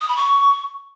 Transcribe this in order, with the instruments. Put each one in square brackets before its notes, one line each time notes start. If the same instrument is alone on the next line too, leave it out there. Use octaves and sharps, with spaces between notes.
[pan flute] D#6
B5
C#6